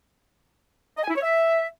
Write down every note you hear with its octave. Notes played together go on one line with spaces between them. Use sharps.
D#5
G#5
E4
C#5
E5